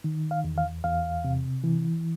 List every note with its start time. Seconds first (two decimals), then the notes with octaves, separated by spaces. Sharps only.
0.04 D#3
0.31 F5
0.44 E2
0.58 F5
0.84 E2 F5
1.24 C3
1.64 E3